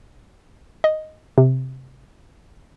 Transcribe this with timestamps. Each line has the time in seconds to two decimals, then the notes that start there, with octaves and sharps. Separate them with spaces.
0.84 D#5
1.38 C3